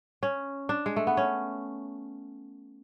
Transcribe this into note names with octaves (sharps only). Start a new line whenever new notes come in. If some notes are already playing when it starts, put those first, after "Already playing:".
C#4
D4
G#3
A3
B3
C#4